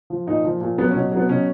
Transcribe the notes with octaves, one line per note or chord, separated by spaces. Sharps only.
F3
A#2 D#4
F3
A#2
F#3 B3
C#4
B2
F#3 B3
B2 C#4